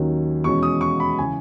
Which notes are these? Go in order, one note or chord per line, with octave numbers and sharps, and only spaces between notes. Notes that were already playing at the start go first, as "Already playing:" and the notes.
Already playing: D#2 D#3 F#3 C#4
E2 B2 G#3 C#4 C#6
D#6
C#6
B5
C#3 E3 G#5